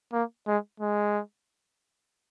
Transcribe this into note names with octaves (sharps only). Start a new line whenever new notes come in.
A#3
G#3
G#3